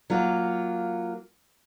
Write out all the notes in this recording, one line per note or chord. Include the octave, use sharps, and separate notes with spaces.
F#3 A#3 F4